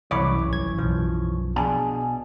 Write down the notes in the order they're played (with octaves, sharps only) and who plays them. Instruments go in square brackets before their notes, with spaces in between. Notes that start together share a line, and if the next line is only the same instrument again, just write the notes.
[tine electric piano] C2 B5 D6 [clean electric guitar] F#2 E3 C#5
[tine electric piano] A1 G#6
B1 F3
[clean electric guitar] B2 G#5 A5 [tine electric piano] D4 G#4